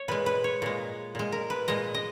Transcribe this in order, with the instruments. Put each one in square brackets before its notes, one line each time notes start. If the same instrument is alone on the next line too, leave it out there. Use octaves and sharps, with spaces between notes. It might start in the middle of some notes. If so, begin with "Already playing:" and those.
Already playing: [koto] C#5
A#2 G#3 B4
B4
C#5
A#2 G#3
A#2 G#3
A#4
B4
A#2 G#3 D#5
D#5